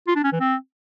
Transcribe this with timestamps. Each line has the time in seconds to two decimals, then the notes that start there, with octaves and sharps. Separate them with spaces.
0.08 F4
0.16 D4
0.24 C#4
0.32 E3
0.40 C4